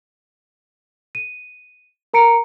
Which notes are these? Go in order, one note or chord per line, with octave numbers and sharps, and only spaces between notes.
D#7
A#4 A#5 C#7 D7